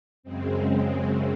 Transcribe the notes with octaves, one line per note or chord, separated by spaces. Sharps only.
F#2 C#3 G#3 C4